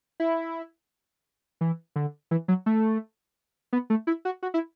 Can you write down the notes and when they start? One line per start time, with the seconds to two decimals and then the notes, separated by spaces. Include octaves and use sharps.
0.20 E4
1.61 E3
1.96 D3
2.31 E3
2.48 F#3
2.66 A3
3.73 B3
3.90 A3
4.07 E4
4.25 F#4
4.43 F#4
4.54 E4